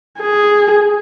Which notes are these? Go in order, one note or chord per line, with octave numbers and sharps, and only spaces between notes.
G#4